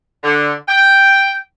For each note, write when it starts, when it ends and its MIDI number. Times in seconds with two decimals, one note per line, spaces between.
0.24 0.53 50
0.68 1.35 79